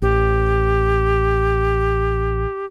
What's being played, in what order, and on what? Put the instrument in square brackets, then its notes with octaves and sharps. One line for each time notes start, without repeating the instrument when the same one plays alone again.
[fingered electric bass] A1 [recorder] G4